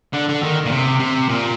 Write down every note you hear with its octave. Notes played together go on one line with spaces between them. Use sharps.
D3
D3
D#3
A#2
C3
C3
A#2